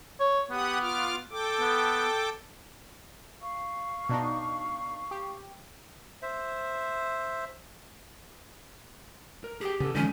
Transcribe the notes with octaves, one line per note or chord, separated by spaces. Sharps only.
C#5
B3 G4 F#5 D#6
F4 D6 F6
A4 G5 D6
B3
F5 C#6
B2 D4 D#4
G4
C5 E5
A#4
G4 G#4 G5
C#3 B3 A4
D3 E3 F3 G#3 C#4 D#4